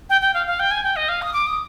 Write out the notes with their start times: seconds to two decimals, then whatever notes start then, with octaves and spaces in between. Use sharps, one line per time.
0.10 G5
0.21 G5
0.34 F5
0.47 F5
0.59 G5
0.71 G#5
0.84 G5
0.96 D#5
1.09 F5
1.22 D#6
1.33 D6
1.47 D#6